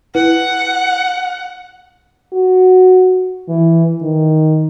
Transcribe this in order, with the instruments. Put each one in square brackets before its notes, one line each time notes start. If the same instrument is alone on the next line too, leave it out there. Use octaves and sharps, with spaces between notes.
[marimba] E4 B4 [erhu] F#5
[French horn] F#4
E3
D#3